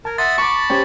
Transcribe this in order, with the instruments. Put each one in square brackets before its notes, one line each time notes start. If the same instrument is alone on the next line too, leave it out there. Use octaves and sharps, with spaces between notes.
[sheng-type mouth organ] A#4 [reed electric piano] A5 G#6
[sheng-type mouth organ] E5 F#5 D#6 [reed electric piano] C6 [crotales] A6
[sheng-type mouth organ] A5 B5 [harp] C#6 D6
[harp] C#4 [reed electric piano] G4 C5 G5